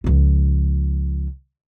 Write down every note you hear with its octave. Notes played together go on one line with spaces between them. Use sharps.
C#2 F3